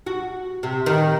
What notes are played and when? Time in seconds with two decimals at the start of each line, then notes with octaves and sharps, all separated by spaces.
0.06 F#4
0.63 C3
0.86 D#3